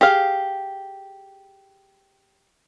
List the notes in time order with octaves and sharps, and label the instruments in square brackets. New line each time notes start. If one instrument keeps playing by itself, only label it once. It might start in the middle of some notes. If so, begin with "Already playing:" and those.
[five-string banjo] G4 G#4 F5